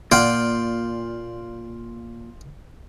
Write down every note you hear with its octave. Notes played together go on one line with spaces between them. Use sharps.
A#2 F4 D5 F#5 G5